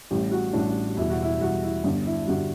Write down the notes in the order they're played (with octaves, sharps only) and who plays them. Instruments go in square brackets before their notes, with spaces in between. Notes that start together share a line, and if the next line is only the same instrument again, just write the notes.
[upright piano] A1 A2 G3 G4
F#4
A1 A2 G3 D4
E1 E2 B2 G3 E4
F#4
E4
E1 E2 B2 G3 F#4
E4
G1 G2 D3 G3
E4
G2 D3 G3 F#4